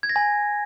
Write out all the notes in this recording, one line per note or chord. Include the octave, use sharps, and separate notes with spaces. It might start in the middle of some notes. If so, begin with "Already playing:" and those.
G#6
A#6
G#5